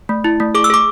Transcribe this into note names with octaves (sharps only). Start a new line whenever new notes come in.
A3
E4
A3
G#4 D6
E6
G#4 D6